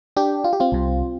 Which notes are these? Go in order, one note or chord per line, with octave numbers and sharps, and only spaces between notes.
D4 G4
F4
G4
C4 F4
C2 C3